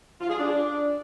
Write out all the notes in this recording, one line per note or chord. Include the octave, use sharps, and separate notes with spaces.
F4
G#4
D4